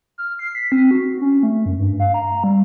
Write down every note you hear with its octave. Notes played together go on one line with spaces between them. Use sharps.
F6
C7
B6
C4
F#4
C#4
A3
F#2
G2
F5
A#5
G3